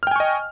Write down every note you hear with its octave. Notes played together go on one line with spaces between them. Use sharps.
D#5 G5 G#5 C#6 F6